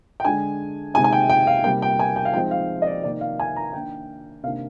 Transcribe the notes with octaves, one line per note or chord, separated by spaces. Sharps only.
G5
D3 G#3 D4 G#5
C3 D#3 G#3 D#4 G#5
G#5
G5
G5
F5
C3 G3 A#3 G5
G5
G#5
G5
F5
F3 G#3 C4 D#4 G5
F5
D#5
D5
C3 D#3 A#3 D#4 D5
F5
G#5
A#5
D#3 A#3 D4 G5
C3 D#3 A#3 D4 F5